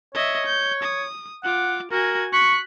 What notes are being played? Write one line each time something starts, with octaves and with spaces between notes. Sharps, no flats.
C#5 D#5 E5
G6
D#6
F4 F#5 D6
F#4 A#4 G#5
C#6 F#6 B6